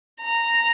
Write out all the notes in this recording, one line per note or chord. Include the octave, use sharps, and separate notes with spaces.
A#5